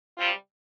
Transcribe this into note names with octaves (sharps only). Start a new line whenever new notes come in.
C3 G3 C4 F4